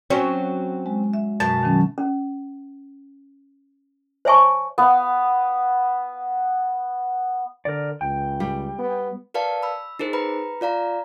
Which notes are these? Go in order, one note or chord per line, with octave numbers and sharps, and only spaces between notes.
F#3 C4 C#4
G#3
E5
F#2 B2 A5
D#3 F#3 C#4
C#4
C5 C#5 E5 G#5 A5 C#6
B3 F5
D3 A#4 D5
C#2 G5
G3
B3
A#4 B4 D5 F5 A5
B5 E6
D#4 G#4 A#4 C5
B4 A#5 B5
F4 D5 F5 A#5